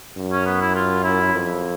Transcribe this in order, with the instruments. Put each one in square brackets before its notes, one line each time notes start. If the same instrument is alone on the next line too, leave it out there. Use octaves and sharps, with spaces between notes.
[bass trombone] F#2
[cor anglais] C#4
B3
E4
F4
E4
[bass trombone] F2